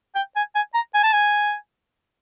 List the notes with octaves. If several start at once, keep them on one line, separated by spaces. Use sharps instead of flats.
G5
G#5
G#5
A#5
G#5
A5
G#5